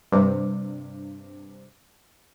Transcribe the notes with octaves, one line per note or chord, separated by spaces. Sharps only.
G2 C3